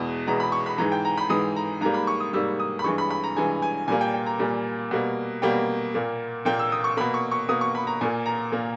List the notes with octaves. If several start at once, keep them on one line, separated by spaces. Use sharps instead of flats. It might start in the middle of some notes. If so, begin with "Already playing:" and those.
Already playing: E2 B2 G#3
E2 B2 G#3 A#5
B5
C#6
B5
G#2 E3 G#3 A#5
G5
A#5
B5
G#2 E3 G#3 D#6
A#5
G#2 G3 A#3 A#5
B5
C#6
D#6
G#2 G3 A#3 E6
D#6
B5
G2 E3 G#3 C#6
B5
B5
A#5
G2 E3 G#3 G#5
G#5
A#2 G3 A#3 G#5
G5
G5
A#5
A#2 G3 A#3
B2 G3 A#3
B2 G3 A#3 G5
A#2 A#3
A#2 A#3 G5
E6
D#6
C#6
B2 A#3 B5
C#6
C#6
B2 A#3 D#6
C#6
B5
A#5
A#2 A#3 G#5
A#5
A#2 A#3